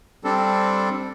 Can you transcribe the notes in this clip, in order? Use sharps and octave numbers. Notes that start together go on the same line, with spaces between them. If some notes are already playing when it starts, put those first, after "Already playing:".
G3 C4 D4 A4